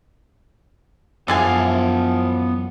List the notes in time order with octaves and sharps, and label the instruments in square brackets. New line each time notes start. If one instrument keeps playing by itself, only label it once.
[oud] F#2 E3 [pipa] D3 G#4 G#5 [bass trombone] F3 [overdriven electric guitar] B3 F5